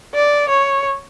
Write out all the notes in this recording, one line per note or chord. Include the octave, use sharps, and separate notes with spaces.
D5
C#5